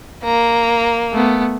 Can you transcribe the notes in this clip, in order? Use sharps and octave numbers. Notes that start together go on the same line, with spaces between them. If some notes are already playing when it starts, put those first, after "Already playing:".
A#3 A#5
A3 B3